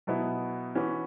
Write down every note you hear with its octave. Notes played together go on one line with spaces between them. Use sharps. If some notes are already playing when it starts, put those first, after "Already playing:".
B2 F#3 B3 E4
E3 C#4 F#4 B4